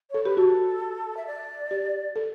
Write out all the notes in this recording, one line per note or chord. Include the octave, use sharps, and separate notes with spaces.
A4 C#5
G4 B4
F#4 A4
E5
D5
G4
A4